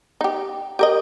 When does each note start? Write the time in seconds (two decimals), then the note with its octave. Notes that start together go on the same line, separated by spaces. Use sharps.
0.21 D#4 G4
0.79 G4 A#4 D#5